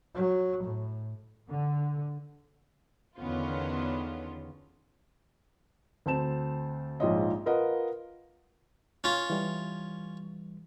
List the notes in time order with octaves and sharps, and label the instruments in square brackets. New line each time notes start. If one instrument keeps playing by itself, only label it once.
[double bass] F#3
A2
[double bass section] D3
[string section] E2 D3 D#3 B3 C#4 F4
[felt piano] D2 C4 A5 E7
A#1 G#2 F3 F4 C#5 D#5
F4 A#4 B4 D#5 F#5
[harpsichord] C#4 F4
[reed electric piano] E3 G3